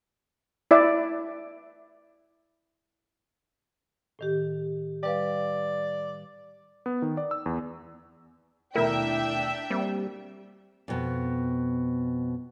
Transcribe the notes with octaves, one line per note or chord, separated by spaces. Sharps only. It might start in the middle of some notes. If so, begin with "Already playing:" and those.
E4 D5 E5
A2 D#3 G4
G3 B4 D5 F5
B3
D#3
D5
E6
E2
D#2 B2 A3 D4 E4 A#4 E5 G5
G3 A#3 C4
F2 B2